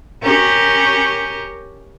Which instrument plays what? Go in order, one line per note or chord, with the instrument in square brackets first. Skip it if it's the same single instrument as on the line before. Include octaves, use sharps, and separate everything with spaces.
[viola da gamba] C#4 G4 A#4